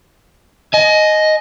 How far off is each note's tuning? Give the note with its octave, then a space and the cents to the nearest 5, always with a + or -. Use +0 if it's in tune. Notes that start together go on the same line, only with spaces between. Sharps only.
D#5 +0 G#5 +40